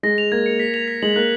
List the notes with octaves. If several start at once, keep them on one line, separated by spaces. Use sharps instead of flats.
G#3 A#6
F7
A#3 G#6
C#7
B6
F7
B6
G#3 F#7
A#3 F#6